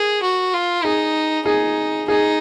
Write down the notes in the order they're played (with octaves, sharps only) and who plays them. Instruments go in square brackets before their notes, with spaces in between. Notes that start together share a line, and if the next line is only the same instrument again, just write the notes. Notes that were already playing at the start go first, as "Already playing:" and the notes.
Already playing: [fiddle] G#4 [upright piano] A#4
[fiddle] F#4
F4
[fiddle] D#4 [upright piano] G#4
[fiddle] D#4 [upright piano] G#4
[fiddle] D#4 [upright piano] G#4